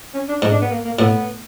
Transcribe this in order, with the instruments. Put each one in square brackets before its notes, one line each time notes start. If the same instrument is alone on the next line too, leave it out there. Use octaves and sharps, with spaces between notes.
[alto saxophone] C#4
D4
[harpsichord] G#2 [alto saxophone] D#4
[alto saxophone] D4
B3
A#3
A#3
[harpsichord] A2 [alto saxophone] B3